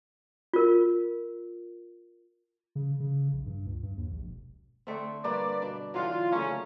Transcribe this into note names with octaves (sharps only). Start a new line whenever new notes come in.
F4 A#4
C#3
C#3
A#1
G2
C#2
G2
D#2
A#1
E1
D3 A3 C4
G2 A#3 D4 B4 D5
B2 D4
D3 E3 F#3 F4
C#3 A3 A#3 C#4